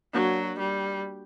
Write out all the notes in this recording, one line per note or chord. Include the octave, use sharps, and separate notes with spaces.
F#3 A#3 D4 F#4 C#5
G3